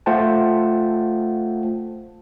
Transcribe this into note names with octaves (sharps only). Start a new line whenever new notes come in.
A3 F4 C5 F#5 G5 A5